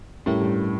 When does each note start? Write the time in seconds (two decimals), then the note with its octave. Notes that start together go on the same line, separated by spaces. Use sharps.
0.26 A2 G3 C#4 E4 G4 A#4
0.42 G2